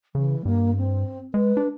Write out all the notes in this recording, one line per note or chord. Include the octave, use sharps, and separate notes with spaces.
C#3 E3
G2 A#3
C4
G#3 B4
D4